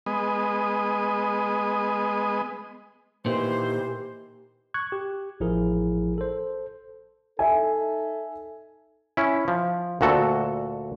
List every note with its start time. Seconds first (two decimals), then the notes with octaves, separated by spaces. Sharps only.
0.06 G#3 B3 D#5
3.26 A#2 D#3 E3 G4 C5
4.74 C#6 F#6 G#6
4.92 G4
5.40 A1 F3 E4 G#4 A#4
6.18 A4 C5
7.39 D#4 A4 E5 G#5
9.17 C#4 E4
9.48 F3
10.01 D2 A#2 F#4 A4